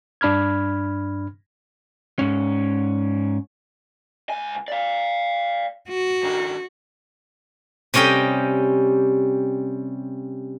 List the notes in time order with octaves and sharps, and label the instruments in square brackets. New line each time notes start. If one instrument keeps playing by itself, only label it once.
[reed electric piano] G2 D4 B5 F6 G#6
[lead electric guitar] G#2 C#4
C#2 G#5
D5 F5
[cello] F#4
[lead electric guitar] D#3 D4
[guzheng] C3 G3 C#4 D#5 G5